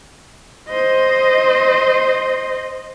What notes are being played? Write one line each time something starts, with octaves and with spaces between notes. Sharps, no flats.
C5 D#5